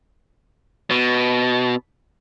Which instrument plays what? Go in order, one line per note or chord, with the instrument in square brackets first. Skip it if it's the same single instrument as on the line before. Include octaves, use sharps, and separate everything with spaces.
[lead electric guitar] B2